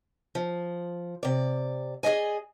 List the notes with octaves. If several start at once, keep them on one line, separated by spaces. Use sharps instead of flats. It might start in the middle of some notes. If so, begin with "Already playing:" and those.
F3
C3 D5
G#4 A#4 D5 D#5 G#5